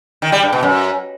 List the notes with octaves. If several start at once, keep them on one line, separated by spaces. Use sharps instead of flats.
D#3
G3
G2
B2
F#2